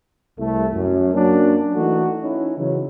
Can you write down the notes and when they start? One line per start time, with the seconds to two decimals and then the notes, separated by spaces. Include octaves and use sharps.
0.39 C2 A3
0.74 F#2
1.14 F#3 A#3 C#4 D4
1.75 E3 A3 D#4 F#4
2.21 C#4 D#4 E4
2.58 C#3 E3 F#3